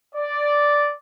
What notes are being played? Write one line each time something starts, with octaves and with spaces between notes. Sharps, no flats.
D5